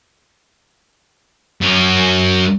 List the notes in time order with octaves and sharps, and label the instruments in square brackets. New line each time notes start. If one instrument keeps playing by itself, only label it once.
[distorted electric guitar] F#2 C#4